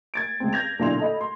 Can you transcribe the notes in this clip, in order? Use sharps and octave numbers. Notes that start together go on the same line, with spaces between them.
G#6 A6 D7
C#2 C4
G6 G#6 A#6 F7
B1 A#2 D3 E4 C6 F7
A4 D#5 B5
C6